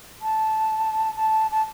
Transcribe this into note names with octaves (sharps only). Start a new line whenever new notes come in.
A5
A5
A5